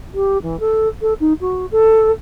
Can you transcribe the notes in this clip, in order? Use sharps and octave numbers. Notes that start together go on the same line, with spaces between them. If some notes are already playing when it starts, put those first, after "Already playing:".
G4
E3
A4
A4
D#4
F#4
A4